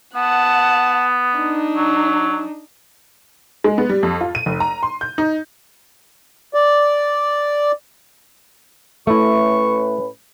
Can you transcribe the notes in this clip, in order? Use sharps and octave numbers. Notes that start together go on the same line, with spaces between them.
B3 F#5 A5
D4 D#4
F#3
G#3
B3
G3
F2
F4
D#7
F1
A#5
C6
G6
D#4
D5
A2 A3 C#4 E4 B4 C#6